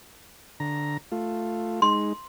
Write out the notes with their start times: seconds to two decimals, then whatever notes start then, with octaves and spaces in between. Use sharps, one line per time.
0.60 D3 A#5
1.12 A3 F4
1.82 G#3 D#4 C6